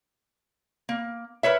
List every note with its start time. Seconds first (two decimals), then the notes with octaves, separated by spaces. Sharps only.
0.89 A#3
1.43 A#4 B4 C#5 E5